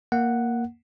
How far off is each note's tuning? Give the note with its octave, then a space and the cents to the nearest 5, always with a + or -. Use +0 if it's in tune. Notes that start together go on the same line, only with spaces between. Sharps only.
A#3 +0 F#5 +0